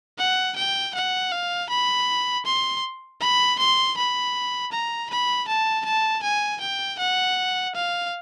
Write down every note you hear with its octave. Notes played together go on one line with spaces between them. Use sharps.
F#5
G5
F#5
F5
B5
C6
B5
C6
B5
A#5
B5
A5
A5
G#5
G5
F#5
F5